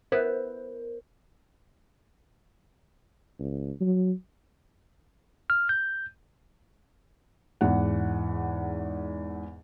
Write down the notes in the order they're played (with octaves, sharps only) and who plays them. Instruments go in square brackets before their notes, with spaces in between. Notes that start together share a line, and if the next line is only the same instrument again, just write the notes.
[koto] B3 E4 [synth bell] A#4 [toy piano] C5
[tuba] C#2
F#3
[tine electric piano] F6
G6
[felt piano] E2 G#2 F#5